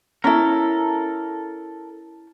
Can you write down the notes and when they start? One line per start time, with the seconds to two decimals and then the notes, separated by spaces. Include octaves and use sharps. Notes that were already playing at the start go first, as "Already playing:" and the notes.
0.24 C#4 E4 A4 A#4